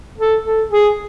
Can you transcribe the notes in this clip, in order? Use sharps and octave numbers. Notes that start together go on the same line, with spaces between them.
A4
A4
G#4